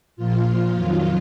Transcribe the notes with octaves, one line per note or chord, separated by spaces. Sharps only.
A#2 F3 F4
F2 D#3 F#3